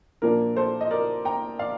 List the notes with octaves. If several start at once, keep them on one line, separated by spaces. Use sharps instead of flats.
A#2 F3 A#3 D4 A#4
A4 C5
D#5
A#4 D5
G5 A#5
D5 F5